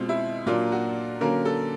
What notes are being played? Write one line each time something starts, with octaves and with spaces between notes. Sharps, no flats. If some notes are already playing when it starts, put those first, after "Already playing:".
Already playing: B2 G#3 C4 F4
E4
A#2 F#3 A#3 D4 F4
F#4
D3 F#3 A#3 C#4 A#4
A4